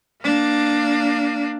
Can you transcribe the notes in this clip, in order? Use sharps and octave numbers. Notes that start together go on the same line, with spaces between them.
A#3 D4